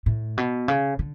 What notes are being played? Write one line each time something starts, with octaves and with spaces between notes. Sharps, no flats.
A2
B2
C#3
D3